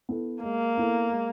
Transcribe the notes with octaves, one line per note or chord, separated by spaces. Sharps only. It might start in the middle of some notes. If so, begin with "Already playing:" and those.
B3 E4 A4
G#3 A#3
B3 E4 A4
G#3